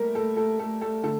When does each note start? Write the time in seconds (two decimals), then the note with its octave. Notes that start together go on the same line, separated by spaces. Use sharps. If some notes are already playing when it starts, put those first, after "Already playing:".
Already playing: G3 A3 A#3 A#4
0.15 A3 A4
0.37 A3 A4
0.59 A3 A4
0.81 A3 A4
1.03 D3 A3 A4